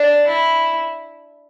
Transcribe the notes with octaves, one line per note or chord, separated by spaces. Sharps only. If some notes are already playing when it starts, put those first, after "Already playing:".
Already playing: D4
E4